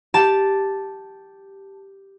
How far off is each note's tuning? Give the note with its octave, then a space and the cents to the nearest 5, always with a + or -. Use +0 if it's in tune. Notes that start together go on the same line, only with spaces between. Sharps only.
G4 +0 A5 +0